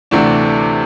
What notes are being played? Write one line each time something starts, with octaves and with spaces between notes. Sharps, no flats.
D2 C3 E3 A3 D4